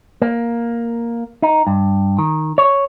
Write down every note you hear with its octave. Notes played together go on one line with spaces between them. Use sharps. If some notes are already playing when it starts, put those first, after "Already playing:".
A#3
D#4
G2
D#3
C#5